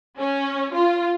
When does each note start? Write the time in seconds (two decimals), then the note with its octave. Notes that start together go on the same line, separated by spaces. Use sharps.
0.18 C#4
0.73 F4